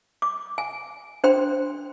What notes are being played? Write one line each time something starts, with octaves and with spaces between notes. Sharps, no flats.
D6
G#5
D4 C5 G5 C6